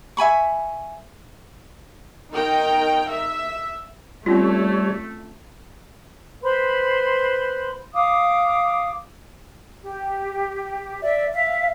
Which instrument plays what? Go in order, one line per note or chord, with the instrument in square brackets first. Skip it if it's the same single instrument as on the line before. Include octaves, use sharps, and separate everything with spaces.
[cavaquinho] E5 G#5 B5 C#6
[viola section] D#3 D#4 A#4 G5 A#5
E5
[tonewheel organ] G3 C#5 [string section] A3 [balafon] C4 C#4 F4
[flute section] B4 C5 B5 C6
F5 D6 D#6
G4
D5 E5
E5 F5